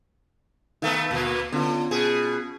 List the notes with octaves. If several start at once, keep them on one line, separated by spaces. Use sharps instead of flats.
D#3 A3 B3 D#4 F5
D2 A#2 A#3 B3
D3 B3 C#4 F4
B2 G#4